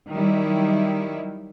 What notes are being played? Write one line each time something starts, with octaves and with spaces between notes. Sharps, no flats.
D#3 F#3 G3 E4